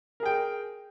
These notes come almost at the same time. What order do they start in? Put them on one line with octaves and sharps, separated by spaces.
A#4 G#4 G5